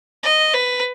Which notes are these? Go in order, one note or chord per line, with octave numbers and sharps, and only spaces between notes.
D#5
B4